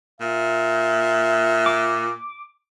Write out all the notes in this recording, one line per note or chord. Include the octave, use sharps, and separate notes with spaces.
A#2 E5
D6